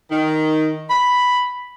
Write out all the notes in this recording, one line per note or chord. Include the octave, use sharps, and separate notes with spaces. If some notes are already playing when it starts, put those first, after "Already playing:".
D#3
B5